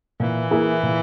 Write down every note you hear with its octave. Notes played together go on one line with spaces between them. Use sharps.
A#2 E3
A#3 E4 G#4
A#2